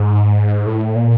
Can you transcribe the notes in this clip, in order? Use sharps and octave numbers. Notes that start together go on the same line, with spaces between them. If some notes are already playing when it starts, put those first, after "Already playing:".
Already playing: G#2
A2
A#2